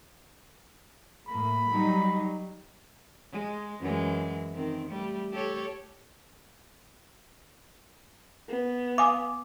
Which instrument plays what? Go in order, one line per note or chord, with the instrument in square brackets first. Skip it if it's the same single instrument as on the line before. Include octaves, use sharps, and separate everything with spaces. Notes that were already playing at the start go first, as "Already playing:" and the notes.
[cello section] A2 A#3 [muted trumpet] B5
[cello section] F#3 G3 D#4
[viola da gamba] G#3
F#2 E3 G#3
D#3 C4
G3 A3
G4 A4 C#5
[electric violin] B3
[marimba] F5 G#5 D#6 [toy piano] D6